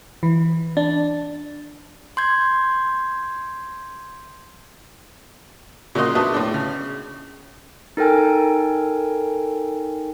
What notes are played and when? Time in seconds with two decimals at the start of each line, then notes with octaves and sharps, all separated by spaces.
0.23 E3
0.77 D4
2.17 C6 G6 G#6
5.95 A#2 C#3 A#3 F#4 D#5 C6
6.15 B3 D4 F#4 D#5 E5 A5
6.34 A2 D4
6.54 C#3
7.97 D#4 A4 A#4 G5 G#5